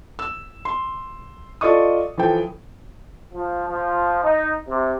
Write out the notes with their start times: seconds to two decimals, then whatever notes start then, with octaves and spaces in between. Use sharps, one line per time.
0.19 E6
0.65 C6
1.61 F4 A4 D5 D#5 C#6 D#6
2.17 E3 F3 A4 G5
3.34 F3
3.69 F3
4.23 D#4
4.68 C3